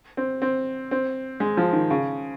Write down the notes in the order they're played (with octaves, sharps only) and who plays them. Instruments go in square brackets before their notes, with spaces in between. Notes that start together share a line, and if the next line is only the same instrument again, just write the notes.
[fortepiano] C4
C4
C4
G#3
F3
D#3
C#3